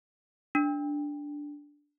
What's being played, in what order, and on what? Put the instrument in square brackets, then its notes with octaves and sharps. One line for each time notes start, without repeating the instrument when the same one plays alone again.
[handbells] D4